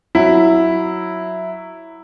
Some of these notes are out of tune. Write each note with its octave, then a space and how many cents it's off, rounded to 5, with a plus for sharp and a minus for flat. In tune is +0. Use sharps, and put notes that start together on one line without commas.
F#3 +0 E4 +0